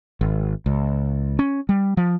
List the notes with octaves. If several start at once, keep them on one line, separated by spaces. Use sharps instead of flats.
G#1
C#2
C#4
G3
F3